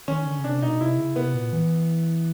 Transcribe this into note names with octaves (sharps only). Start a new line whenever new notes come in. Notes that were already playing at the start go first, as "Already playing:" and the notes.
D#3 C#4
D3
C#3
C3 D4
B2 D#4
C3 E4
C#3
C3 B3
A#2
E3